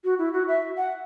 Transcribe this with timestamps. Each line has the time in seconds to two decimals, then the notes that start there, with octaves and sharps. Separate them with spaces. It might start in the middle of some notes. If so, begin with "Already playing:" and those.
0.04 F#4
0.19 E4
0.33 F#4
0.48 E5
0.77 F#5